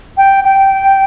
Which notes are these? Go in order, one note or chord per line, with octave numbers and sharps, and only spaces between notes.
G5
G5